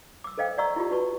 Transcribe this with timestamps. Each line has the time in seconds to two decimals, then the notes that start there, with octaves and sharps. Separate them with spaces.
0.24 D6 E6
0.38 A4 C5 D#5 F5 G5
0.58 D5 D#5 F#5 A#5 C#6 E6
0.76 E4 F4 G4
0.91 E4 F#4 B4 A5 C#6